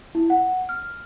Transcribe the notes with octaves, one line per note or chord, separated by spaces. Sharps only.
E4
F#5
F6